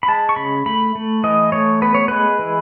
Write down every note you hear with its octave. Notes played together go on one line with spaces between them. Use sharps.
B5
G#3 A5
C#6
C#3 B5
A3 B5
A3
E3 D#5
A3 C#5
B3 B4
C#5
G#3 B4
E3